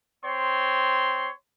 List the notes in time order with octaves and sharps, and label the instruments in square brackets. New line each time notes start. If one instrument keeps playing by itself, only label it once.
[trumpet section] C4 C#5 C6